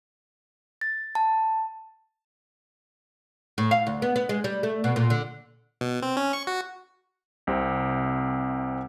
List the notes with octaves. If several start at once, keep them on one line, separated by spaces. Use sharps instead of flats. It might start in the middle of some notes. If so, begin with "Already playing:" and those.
A6
A5
A2
F5
D2
B3
B3
G#3
G3
A3
B2
A#2
D3
B2
C4
C#4
C#6
F#4
C2 C3 C4